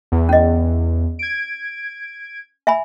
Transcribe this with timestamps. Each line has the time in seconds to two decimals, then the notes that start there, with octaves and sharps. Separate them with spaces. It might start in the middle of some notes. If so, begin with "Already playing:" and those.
0.12 E2
0.29 C#4 D#5
1.19 G#6 D7
2.67 E5 G#5 B5